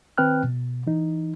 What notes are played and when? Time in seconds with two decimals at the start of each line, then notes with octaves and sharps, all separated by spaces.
0.18 D#3 C4 B4 G5 F6 F#6
0.45 B2
0.87 E3 D#4